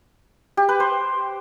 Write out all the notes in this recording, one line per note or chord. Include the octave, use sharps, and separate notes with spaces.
G4
B4
C5